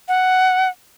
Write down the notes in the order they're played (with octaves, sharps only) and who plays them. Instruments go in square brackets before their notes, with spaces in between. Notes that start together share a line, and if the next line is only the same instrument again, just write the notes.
[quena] F#5